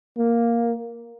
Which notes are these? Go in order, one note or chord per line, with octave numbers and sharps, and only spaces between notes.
A#3